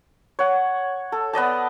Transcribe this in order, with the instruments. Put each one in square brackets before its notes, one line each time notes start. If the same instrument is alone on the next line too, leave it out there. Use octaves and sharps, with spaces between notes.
[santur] C#5 F#5
A4
B3 D5 D#5 A5